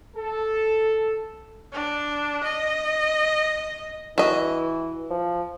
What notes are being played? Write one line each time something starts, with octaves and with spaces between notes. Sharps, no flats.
A4
D4
D#5
E3 F#4 D#5
F3